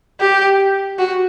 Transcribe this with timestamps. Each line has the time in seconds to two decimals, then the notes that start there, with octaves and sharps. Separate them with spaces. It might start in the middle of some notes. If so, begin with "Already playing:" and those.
0.20 G4
0.99 F#4